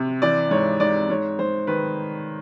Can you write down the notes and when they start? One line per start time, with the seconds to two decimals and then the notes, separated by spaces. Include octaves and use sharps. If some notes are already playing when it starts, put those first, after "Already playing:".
Already playing: C3
0.22 E3 D5
0.51 G#2 C#5
0.80 G#2 D5
1.10 G#2 C#5
1.39 G#2 C5
1.67 D#3 B4